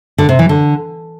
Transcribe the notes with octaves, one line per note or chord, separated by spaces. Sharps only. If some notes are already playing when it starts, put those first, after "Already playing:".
D3
C3
E3
D3